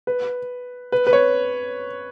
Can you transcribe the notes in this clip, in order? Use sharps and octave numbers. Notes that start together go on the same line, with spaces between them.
B4
B4
B4
C#5